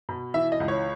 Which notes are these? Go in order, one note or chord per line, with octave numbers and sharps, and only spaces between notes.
B2
E3 E5
D#5
C#2
C#5